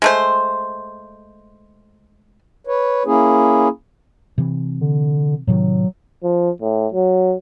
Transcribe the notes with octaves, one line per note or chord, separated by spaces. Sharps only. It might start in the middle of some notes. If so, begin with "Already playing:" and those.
G#3 A3 C5
B4 C#5
A#3 C#4 E4 G#4
C3 E3 C4
D3
A2 C3 D#3 F#3
F3
A2
F#3